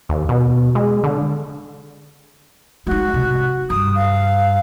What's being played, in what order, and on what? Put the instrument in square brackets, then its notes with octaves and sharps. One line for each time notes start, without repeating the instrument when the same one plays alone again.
[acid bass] D#2
B2
G#3
D3
[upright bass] G#3 D#4 [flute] F#4
[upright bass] C3
[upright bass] G2 [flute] D#6
[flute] F5